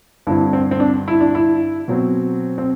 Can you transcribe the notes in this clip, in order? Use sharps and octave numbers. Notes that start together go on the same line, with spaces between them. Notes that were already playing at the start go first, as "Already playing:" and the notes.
G2 D3 G3 C4 E4
C4
C4
D4
E4
D4
E4
B2 F#3 C4
C4